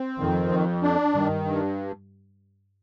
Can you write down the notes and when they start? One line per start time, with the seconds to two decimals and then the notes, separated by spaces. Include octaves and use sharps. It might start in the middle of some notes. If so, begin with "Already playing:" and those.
Already playing: C4
0.20 F2 D#3
0.52 F2
0.83 D4
1.14 G2 D#3
1.45 G2